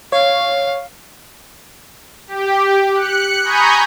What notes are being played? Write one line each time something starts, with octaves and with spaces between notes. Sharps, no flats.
C#5 F5
G4
F#6 C#7
G#5 A#5 B5 C#6 D#6 G6